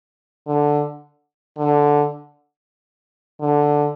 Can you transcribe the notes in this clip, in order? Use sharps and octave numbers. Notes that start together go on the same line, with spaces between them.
D3
D3
D3